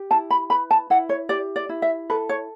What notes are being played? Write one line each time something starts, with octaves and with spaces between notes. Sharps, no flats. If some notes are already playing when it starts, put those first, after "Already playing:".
Already playing: G4
E4 A5
B5
B4 B5
A5
E4 F#5
C#5
G4 D5
D5
E4
E5
A4 B4
C#5